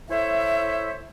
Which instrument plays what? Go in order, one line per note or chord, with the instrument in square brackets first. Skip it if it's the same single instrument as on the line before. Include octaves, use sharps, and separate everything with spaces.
[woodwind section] E4 A4 C5 C#5 E5